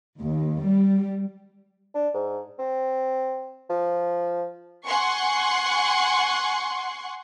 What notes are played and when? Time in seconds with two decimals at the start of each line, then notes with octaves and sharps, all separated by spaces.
0.19 D#2
0.62 G3
1.95 D4
2.14 G#2
2.59 C4
3.70 F3
4.86 F#5 G#5 C6 C#6